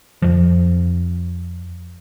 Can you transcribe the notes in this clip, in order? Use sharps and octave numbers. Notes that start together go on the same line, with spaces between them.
F2 F3